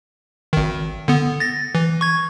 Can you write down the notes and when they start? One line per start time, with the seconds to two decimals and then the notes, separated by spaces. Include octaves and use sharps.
0.53 G#1 D#3
1.08 D3 B3
1.40 A6 A#6
1.75 E3
2.01 C#6 G#6